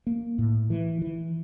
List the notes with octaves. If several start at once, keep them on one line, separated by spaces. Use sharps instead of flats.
A#3
A2
E3
E3